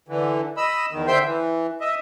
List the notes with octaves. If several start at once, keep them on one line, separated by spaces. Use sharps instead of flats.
D3 E3
D#5 B5 E6
E2 D#3
D3 C5 E5 G5 C6 G6
E3
D#5 E5